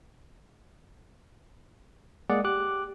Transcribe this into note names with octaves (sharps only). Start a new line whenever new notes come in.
G#3 A#3 G#4 D5 F#5
G4 D6 F#6